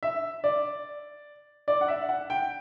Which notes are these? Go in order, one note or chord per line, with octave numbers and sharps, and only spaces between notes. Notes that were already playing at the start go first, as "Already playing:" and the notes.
E5
D5
D5
F#5
E5
F#5
G5